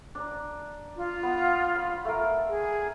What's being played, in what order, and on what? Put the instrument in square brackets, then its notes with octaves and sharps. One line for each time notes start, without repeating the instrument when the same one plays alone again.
[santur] D4 A#5
[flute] F4
[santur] B3
B5
A3 A#4
[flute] G#4